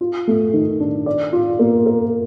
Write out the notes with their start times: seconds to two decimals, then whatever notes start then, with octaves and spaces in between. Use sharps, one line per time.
0.01 F4
0.28 A3
0.54 D#3
0.80 D4
1.06 D5
1.33 F4
1.59 A#3
1.86 A#4